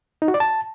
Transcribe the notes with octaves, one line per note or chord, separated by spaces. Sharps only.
D#4
F#4
D5
A5